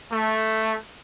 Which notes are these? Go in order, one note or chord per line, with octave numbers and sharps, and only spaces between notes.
A3